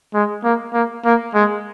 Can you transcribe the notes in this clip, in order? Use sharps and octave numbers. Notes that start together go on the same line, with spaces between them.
G#3
A#3
A#3
A#3
G#3